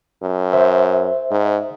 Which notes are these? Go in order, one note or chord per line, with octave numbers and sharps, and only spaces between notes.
F#2
C5 E5
G#2